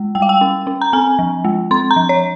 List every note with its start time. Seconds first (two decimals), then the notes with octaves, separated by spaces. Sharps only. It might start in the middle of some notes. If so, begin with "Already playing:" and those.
Already playing: G#3
0.15 G3 G5
0.22 F5
0.29 G5
0.41 C#4
0.67 C#4
0.81 A#5
0.93 C4 G#5
1.19 F3
1.45 G#3
1.71 C4 C6
1.91 A#5
1.96 F3
2.09 C#5